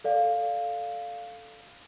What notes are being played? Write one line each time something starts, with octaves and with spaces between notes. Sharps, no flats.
A4 D5 F5